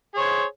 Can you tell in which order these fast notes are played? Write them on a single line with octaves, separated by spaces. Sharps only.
G#4 C#5 C5